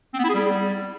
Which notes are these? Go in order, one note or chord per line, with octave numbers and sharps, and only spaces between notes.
C4
B3
E4
G#4
G3